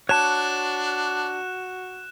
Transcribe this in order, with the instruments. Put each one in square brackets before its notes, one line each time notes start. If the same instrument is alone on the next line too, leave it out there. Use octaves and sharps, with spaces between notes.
[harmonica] D4 [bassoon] F#4 [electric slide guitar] C#5 A5 [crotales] F#6 E7